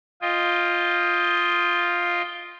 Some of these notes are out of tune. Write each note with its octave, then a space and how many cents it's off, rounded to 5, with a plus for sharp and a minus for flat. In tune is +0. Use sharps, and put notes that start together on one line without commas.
F4 +0 D#5 +0 G5 +20